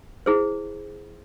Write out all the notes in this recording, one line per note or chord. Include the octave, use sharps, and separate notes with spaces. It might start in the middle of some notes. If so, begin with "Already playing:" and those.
E4 G#4 C5